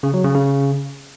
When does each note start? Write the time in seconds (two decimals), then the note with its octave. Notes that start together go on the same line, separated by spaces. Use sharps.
0.03 C#3
0.14 F#3
0.24 C#3
0.35 C#3